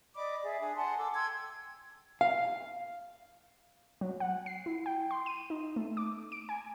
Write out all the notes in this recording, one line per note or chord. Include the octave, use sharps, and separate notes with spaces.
D5 D#5 B5 D6
G#4 D5 E5
D4 G#4
F#5 G#5 A5 C6
A4 D6 E6
G5 C6 E6 G#6
F5
F#3
F#5
C7
E4
G5
C6
D#7
D#4
A3
D6
D7
G#5